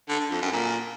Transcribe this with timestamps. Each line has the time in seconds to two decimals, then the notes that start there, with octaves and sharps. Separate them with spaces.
0.09 D3
0.20 D3
0.31 F2
0.42 F#2
0.53 A#2